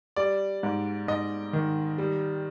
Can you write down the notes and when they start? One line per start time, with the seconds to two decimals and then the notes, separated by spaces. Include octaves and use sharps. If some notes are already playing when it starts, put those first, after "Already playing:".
0.16 G3 D5
0.63 G#2
1.08 G#2 D#5
1.53 D#3
1.98 G3